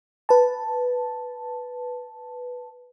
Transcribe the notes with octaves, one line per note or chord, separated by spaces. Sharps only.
B4 A5